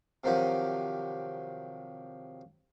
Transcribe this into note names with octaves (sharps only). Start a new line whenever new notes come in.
C3 D#3 F3 F#3 G4